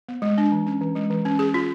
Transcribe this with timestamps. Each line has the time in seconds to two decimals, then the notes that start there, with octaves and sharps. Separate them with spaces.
0.09 B3
0.22 G#3
0.38 D4
0.52 E3
0.66 C#4
0.81 E3
0.95 G#3
1.10 E3
1.25 C#4
1.39 G#4
1.54 F4